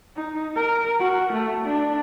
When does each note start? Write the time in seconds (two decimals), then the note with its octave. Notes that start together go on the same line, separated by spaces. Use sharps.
0.17 D#4
0.56 A#4
1.00 F#4
1.33 A3
1.66 D4